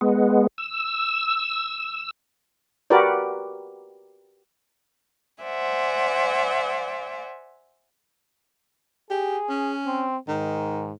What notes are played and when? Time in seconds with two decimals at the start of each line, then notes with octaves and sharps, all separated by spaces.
0.01 G#3 B3
0.58 E6
2.90 F#4 G4 A#4 B4 D5
5.43 C5 D5 E5 F#5 G#5
9.10 G4 G#4
9.50 C#4
9.86 C4
10.28 G#2 D#3